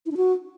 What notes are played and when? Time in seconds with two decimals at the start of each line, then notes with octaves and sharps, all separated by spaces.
0.06 E4
0.11 D4
0.17 F#4